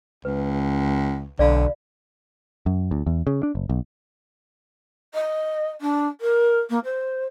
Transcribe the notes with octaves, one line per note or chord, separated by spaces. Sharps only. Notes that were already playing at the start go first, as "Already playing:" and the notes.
C#2 B4
B1 D3 D5 F5 B5
F#2
D2
E2
C#3
D4
F#1
B1
D#5
D4
A#4
A#3
C5